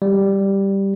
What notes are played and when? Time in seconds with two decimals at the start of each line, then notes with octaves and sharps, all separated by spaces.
0.02 G3